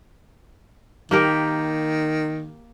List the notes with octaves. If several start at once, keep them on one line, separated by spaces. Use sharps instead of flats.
D#3 A#3 G4 A#4